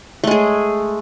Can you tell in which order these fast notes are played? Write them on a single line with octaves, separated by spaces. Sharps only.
A3 G#3 G#4